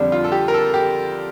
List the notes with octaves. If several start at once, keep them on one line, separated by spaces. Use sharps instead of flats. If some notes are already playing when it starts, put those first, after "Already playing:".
Already playing: F2 D3 G3 D4
F4
A4
G4
A#4
A4
G4